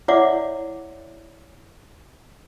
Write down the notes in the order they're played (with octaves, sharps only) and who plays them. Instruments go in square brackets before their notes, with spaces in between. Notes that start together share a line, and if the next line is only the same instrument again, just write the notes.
[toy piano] E4 C#5 D5 E5 F#5 D6